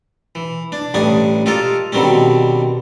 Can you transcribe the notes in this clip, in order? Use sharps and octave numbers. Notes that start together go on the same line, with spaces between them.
E3
D4
A1 G2 C#4 D4 G#5 D#6
F4 G4 A4 A#4 D#5 F5
B2 D3 D#3 G3 C4 C#4